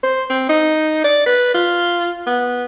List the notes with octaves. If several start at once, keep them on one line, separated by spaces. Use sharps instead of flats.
C5
C4
D#4
D5
B4
F4
B3